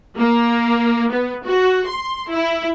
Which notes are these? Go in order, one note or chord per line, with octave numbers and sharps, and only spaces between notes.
A#3
B3
F#4
C6
E4